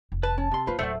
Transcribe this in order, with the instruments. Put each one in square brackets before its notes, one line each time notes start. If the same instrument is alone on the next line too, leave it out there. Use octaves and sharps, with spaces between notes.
[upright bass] F1
[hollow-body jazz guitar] B4 [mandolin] A5
[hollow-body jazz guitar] C#4
C3 C6
[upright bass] A#3 [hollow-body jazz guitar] F4 B4 C5
[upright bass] D1 [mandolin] A3 [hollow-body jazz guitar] C5 D5 F#5